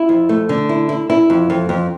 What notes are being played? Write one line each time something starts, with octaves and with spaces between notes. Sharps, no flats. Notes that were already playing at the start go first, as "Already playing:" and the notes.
Already playing: E4
F2
A3
D3
E4
E4
E4
F2
F2
F2